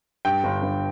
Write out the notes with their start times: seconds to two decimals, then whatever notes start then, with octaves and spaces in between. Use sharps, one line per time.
0.25 G2 G5
0.44 G1
0.62 G1